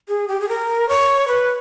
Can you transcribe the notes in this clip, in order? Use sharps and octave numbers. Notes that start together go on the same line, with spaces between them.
G#4
G4
G#4
A#4
C#5
B4